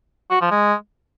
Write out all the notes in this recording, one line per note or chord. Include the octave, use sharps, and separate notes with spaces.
F#4
F3
G#3